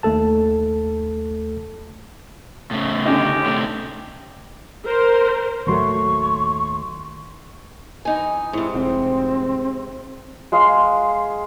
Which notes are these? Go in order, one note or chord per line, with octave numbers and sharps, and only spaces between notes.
D#2 A3 A4 A5
A2 C#3
D3 C#4 D#4 G4
A2 C3
A#4 C5
A1 D#2 F#3 A3 C6 C#6
E3 D#4 G#5
G#2 C3 E4
F1 C4
G#3 G#4 F5 C6